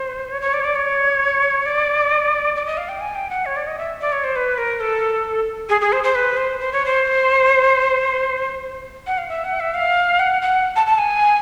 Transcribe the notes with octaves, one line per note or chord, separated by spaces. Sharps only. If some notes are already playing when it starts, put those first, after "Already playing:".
Already playing: C5
C#5
C#5
D5
C#5
D5
C#5
D5
D5
D#5
F5
G5
G#5
G5
F#5
C#5
D5
D#5
E5
D5
C#5
C5
B4
A#4
A4
G#4
G#4
C5
C5
B4
C5
C5
C#5
C5
F#5
F5
E5
F#5
E5
F5
F#5
F#5
A5
A5
G#5